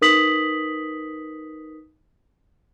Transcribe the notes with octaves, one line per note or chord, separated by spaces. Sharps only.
D#4 A#4 B4 D#6 B6 F#7